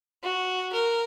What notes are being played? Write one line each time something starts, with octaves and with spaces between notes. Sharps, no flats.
F#4
A#4